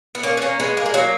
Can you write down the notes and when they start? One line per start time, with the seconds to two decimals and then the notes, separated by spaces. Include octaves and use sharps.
0.15 B3
0.23 A#3 C#4
0.37 B3
0.42 A#3 C#4
0.60 G#3 B3
0.77 A#3
0.86 G#3
0.94 F#3 A#3